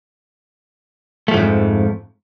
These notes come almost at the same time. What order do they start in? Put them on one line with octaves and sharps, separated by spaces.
A3 F3 G#2 F2